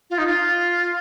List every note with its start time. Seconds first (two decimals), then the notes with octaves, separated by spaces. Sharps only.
0.10 F4
0.18 D#4
0.27 F4